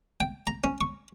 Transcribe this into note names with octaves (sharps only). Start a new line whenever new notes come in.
G5
A#5
C#4
C#6